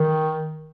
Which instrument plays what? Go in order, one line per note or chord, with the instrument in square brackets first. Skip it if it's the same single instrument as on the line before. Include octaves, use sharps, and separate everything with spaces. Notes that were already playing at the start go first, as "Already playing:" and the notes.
Already playing: [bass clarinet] D#3